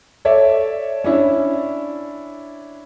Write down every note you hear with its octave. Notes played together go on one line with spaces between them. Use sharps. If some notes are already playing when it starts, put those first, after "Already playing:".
A4 C#5 D5 E5
C#4 D4 E4